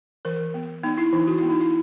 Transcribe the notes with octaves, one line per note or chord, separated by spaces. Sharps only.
E3 A#4
B3
B3 D#4
E4
E3 D#4
F#4
B3 E4
D#4
E4